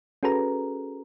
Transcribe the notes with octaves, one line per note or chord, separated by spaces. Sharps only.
C#4 F#4 G#4 A4 B4 A#5